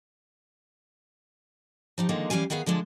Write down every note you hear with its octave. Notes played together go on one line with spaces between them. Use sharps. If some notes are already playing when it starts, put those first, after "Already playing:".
F3 D#4 G4
D3 D#3 F3 G#3 A#3 D#4
E3 G3 C#4 F5 G#5
D#3 B3 G#4 B4 F5
D3 F3 G#3 D4